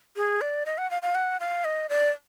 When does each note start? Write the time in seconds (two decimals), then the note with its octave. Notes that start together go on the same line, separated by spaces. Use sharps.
0.16 G#4
0.41 D5
0.66 D#5
0.78 F#5
0.91 F5
1.02 F5
1.15 F#5
1.40 F5
1.65 D#5
1.89 D5